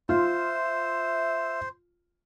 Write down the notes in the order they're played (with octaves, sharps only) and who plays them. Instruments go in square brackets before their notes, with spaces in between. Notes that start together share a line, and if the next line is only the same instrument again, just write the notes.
[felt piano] F4 [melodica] C5 [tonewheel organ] E5